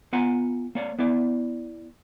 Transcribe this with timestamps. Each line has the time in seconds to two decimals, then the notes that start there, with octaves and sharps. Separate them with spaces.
0.13 B3 F4 F#5 G#5 A#5
0.75 A#3 C#5 D5
0.99 B3 E4 D5